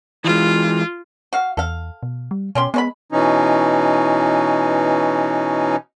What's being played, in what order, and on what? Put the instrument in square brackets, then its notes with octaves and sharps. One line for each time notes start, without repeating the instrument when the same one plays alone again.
[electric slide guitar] E3 G#3 [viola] F4
[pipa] F#4 F5
[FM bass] E2 [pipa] A4 F5
[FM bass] B2
G3
[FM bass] B2 [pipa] C#4 G4 C6
[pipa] G#3 C#5 B5 [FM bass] B3
[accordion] B2 E3 C#4 D#4